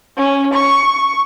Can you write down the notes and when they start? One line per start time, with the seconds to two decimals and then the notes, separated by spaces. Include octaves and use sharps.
0.17 C#4
0.54 C#6